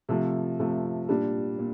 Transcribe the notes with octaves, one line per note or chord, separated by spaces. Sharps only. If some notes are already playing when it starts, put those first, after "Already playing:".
C3 F3 A3
C3 F3 A3
A#2 G3 D4
A#2